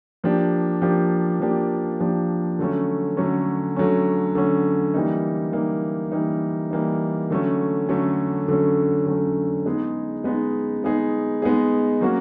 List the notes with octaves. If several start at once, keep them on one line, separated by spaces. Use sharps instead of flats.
F3 A#3 D4 G4
F3 A#3 D4 G4
F3 A#3 D4 G4
F3 A#3 D4 G4
D3 F#3 A3 C#4
D3 F#3 A3 C#4
D3 F#3 A3 C#4
D3 F#3 A3 C#4
E3 G3 A#3 D#4
E3 G3 A#3 D#4
E3 G3 A#3 D#4
E3 G3 A#3 D#4
D3 F#3 A3 C#4
D3 F#3 A3 C#4
D3 F#3 A3 C#4
D3 F#3 A3 C#4
G#3 B3 D#4 G#4
G#3 B3 D#4 G#4
G#3 B3 D#4 G#4
G#3 B3 D#4 G#4
F#3 A#3 C#4 F#4